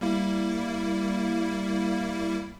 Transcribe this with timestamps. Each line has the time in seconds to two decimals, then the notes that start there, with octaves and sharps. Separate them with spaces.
0.01 G3 A#3 E4